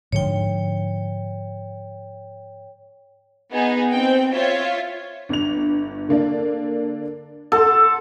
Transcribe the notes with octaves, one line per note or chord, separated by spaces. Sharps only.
G#2 D3 F3 C#5 G5
B3 D#4 G#4
C4 G5
F4 C#5 E5
G1 G2 F7
D3 A#3 D4
A4 F#5 C6